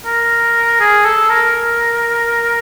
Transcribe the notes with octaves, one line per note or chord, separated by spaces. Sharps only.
A#4
G#4
A4
A#4